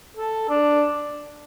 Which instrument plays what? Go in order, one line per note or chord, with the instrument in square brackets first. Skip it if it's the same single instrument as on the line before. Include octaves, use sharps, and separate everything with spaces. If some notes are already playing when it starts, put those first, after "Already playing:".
[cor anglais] A4
D4